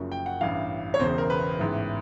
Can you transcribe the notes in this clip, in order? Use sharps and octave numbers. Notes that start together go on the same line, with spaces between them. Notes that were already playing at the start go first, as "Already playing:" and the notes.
Already playing: F#1 F#2 C#3 F3
G5
F#5
A1 G2 E3 F5
C#5
E1 E2 C#3 C5
A#4
B4
A1 G#2 E3